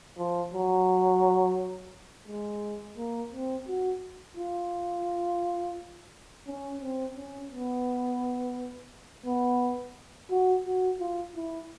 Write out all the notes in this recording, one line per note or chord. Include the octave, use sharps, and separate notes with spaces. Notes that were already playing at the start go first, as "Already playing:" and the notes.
F3
F#3
G#3
A#3
C4
F#4
F4
C#4
C4
C#4
B3
B3
F#4
F#4
F4
E4